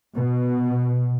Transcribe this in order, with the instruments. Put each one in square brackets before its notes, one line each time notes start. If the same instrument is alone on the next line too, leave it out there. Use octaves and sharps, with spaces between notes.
[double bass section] B2